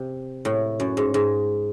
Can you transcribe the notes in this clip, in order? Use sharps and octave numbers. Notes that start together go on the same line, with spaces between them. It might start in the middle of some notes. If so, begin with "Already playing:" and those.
Already playing: C3
A2
F#2
G#2
G#2